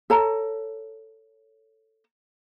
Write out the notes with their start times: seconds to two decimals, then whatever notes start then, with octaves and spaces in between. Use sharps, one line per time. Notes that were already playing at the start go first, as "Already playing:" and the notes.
0.10 A4 C#5 A5 A#5